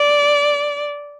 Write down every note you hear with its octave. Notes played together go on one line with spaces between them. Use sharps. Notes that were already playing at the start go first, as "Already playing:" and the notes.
Already playing: D5